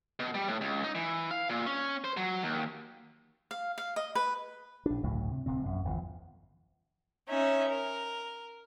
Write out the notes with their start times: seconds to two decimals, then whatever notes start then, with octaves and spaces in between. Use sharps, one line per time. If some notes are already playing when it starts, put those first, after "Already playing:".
0.19 B2
0.34 G3
0.48 A2
0.61 C#2
0.84 D#4
0.95 E3
1.31 F5
1.50 A#2
1.66 C#4
2.04 C5
2.17 F#3
2.43 D#2
3.51 F5
3.78 F5
3.96 D#5
4.15 B4
4.86 A#1 D4
5.03 G1 C#2 A2 F#3
5.31 C3
5.46 D1 C3 C4
5.65 A#1 F#2
5.85 G1 E2 F3
7.27 C#4 D#4 E5
7.70 A#4